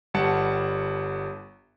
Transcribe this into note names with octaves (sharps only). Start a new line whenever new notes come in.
G1 G3 F#5 A5 C#7